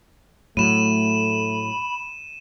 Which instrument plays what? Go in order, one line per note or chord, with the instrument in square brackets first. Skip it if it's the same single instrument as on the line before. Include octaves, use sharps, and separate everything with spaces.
[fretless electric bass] A2 F#3 [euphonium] A3 [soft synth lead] B5 [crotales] D#7 E7